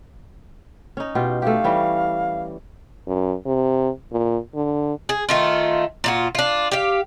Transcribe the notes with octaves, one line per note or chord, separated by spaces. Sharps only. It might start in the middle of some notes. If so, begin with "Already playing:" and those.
C#4 D#4
B2 F4 G4
A3 G4 F5
E3 G3 C#4
F#2
C3
A#2
D3
G#4
D#3 A3 F4
A#2 F4 F#4
D4 F4
G4 F5